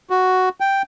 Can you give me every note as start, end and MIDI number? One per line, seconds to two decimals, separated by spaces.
0.10 0.49 66
0.60 0.82 79